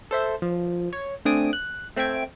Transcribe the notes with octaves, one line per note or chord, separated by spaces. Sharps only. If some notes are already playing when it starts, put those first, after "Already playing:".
A4 C5 E5
F3
C#5
A3 C4 D4 G#5 D#6 D7
F#6
A3 C4 E5 G5 G#6 D7